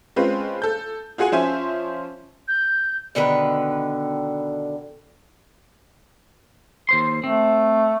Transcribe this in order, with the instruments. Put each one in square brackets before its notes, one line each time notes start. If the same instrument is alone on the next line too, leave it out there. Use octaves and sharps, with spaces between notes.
[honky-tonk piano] G#3 C4 C#4 F4 B4
A4 G6
F4 F#4 G#4 F#5 G#5
F3 C#4 C5 E5 G#5
[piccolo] G6
[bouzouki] B2 D3 D#3 B4
[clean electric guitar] D#2 C5 C6
[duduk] A3 [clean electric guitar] C4